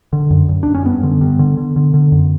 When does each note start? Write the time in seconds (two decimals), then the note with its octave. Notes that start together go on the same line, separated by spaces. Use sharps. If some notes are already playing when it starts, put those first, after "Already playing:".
0.13 D3
0.30 F#2
0.49 F#2
0.63 F#2 D4
0.74 C#4
0.85 G2 B3
1.03 D3
1.21 G2
1.39 D3
1.57 D3
1.76 D3
1.94 D3
2.12 F#2